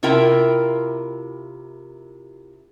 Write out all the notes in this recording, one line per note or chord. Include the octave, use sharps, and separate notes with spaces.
C3 E4 F4 A#4 G5